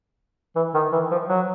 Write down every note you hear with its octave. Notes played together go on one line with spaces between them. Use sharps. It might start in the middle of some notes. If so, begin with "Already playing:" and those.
E3
D#3
E3
F3
F#3